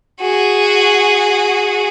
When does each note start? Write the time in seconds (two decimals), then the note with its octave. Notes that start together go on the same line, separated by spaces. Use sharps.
0.22 F#4 G#4